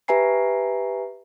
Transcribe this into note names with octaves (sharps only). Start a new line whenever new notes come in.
G4 B4 E5 G#5 A#5 C7